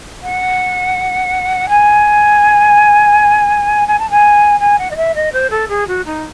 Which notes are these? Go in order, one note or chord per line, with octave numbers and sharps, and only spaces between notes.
F#5
G#5
G#5
A5
G#5
G#5
F#5
D#5
E5
D#5
C5
A4
G#4
F#4
D#4